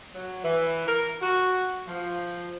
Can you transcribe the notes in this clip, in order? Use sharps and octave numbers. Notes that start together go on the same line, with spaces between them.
F#3
E3
A#4
F#4
F3